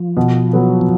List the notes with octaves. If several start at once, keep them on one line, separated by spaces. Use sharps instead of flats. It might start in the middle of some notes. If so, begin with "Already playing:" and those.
Already playing: F3
B2
F#3 B3
B2